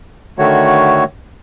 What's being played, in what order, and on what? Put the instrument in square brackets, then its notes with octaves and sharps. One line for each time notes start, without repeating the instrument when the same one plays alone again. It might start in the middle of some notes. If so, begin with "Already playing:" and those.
[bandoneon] D3 D#3 A3 F#4 C#5